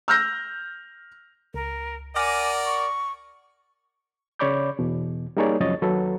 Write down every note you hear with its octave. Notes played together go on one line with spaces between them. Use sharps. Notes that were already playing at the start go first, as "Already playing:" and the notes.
E6 F6 G6 A#6
C#2 A#4
A#4 D5 F#5 G#5 D6 F6 A#6
C#6
C#3 C#5 D5 B5 D6 G6
E2 B2
G3 A#3 D#4 G#4 C#5 D5
C#2 F#2 F3 C#5 D#5 A6
D#2 F#3 A4 B4